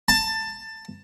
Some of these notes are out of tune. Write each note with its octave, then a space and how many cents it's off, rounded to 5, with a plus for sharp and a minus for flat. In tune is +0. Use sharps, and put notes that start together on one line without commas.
A5 +15